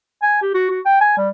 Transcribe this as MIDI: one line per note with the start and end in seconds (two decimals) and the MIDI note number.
0.23 0.37 80
0.42 0.51 67
0.54 0.67 66
0.70 0.80 66
0.85 1.00 79
1.01 1.13 80
1.17 1.29 55